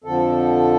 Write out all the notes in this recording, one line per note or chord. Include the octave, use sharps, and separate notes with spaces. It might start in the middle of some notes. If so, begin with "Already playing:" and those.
F2 D3 F3 A4